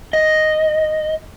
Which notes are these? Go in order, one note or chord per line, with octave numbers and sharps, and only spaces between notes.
D#5